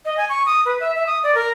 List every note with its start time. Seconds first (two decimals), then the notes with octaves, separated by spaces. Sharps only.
0.05 D#5
0.17 G#5
0.29 C#6
0.46 D#6
0.66 B4
0.80 E5
0.95 E5
1.07 D#6
1.23 D5
1.35 A#4